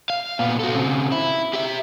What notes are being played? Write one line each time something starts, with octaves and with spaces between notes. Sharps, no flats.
F5
A#2 B3
F#4 A4
C#3 C4
E4
G4 E5